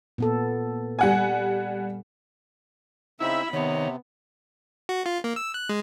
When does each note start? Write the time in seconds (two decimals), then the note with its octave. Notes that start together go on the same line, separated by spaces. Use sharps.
0.18 A#2 B3 A4
0.99 G3 F#5 G#5
3.20 C#3 C4 D#4 E4 E5 B5
3.53 C3 D#3 B3 C#5
4.89 F#4
5.06 F4
5.24 A#3
5.36 E6
5.54 F#6
5.69 G#3